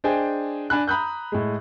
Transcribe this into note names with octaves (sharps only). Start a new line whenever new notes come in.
D4 G#4 C5 D#5 G5 G#5
D4 G#5 B5 F#6
A#5 B5 D#6 F#6 G6
A2 G#3